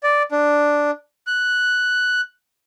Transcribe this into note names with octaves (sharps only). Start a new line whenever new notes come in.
D5
D4
F#6